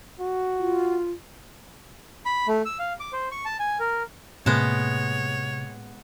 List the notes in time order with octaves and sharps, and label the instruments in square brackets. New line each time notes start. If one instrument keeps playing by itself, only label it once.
[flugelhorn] F#4
[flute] F4
[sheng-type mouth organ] B5
A3
E6
F5
D6
C5
C#6
A5
G#5
A#4
[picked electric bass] A2 A#3 [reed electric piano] C3 [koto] G#3 B3 A5 [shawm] C#5